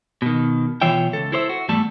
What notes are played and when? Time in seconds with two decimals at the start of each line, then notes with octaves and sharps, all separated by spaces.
0.22 B2 D#3
0.82 B2 E3 F4 C#5 E5 G5
1.13 C#2 A4
1.32 E4 A4 C5 C#5 E5
1.49 F#4
1.69 E2 G#2 G3 A3 A4